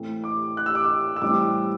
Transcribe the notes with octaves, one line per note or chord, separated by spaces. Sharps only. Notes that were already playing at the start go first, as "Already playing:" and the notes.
Already playing: A2 E3 A3 C4
D6
F#6
E6
D6
E6
E6
A2 E3 G3 C4 D6